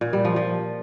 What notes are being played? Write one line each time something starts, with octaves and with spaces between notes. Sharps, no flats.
A#2
G3
F3
F3